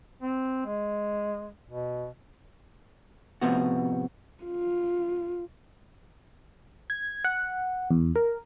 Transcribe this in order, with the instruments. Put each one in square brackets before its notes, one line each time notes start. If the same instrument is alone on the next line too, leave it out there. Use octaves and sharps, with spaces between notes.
[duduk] C4
G#3
B2
[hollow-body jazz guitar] A2 C3 F3 B3 F#4
[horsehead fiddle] F4
[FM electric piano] G#6
F#5
E2
A#4